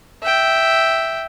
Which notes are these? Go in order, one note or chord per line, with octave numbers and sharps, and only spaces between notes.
E5 G5